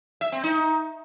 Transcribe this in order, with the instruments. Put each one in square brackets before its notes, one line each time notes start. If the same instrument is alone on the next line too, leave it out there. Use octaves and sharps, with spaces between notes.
[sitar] E5
C4
D#4